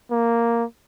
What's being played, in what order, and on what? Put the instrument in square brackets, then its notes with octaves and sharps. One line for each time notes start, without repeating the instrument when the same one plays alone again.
[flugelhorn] A#3